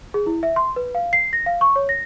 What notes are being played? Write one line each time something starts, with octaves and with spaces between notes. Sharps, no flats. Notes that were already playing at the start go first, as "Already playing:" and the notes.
G#4
E4
E5
C6
B4
F5
C7
A#6
F5
C#6
C#5
A#6